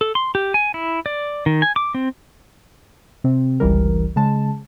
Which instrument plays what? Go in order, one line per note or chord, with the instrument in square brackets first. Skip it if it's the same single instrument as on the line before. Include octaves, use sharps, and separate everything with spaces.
[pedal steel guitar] A4
C6
G4
G#5
E4
D5
D#3
G#5
D6
C4
[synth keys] C3 C4
G1 C#2 E3 G3 A#4
C#3 G#3 A5